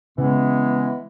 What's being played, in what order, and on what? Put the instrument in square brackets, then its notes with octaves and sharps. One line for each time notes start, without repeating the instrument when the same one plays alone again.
[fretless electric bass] C#3 [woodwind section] E3 G#3 B3